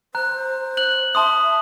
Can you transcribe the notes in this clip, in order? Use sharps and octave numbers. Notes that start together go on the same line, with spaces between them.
C5 A#5 F#6
F#6 F#7
E5 A5 C6 D#6